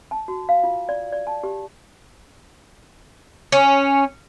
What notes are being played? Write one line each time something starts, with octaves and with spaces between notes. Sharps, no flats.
A5
F#4
F5
F4
D5
D5
A5
G4
C#4